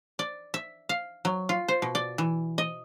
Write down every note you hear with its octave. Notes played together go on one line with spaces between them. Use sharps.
D5
E5
F5
F#3
F4
C5
B2
D5
E3
D#5